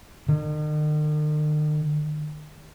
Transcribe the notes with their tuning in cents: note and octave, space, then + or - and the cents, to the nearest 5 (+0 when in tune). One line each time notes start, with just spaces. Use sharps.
D#3 -45